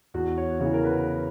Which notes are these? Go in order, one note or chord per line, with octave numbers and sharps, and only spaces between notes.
E2 F#4
C#5
C#3 E3 C#5
A#4
B4